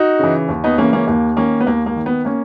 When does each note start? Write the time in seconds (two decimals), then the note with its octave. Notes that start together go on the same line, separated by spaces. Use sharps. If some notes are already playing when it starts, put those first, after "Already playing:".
Already playing: D#4 F#4
0.19 C#3 E3
0.48 D#2
0.64 B3 D#4
0.78 C#3 E3 A#3 C#4
0.93 A#3 C#4
1.07 D#2 A#3
1.37 D#3 A#3 C#4
1.61 B3
1.67 D#2 A#3
1.86 A#3
1.96 D#3
2.06 B3
2.25 A#3 C#4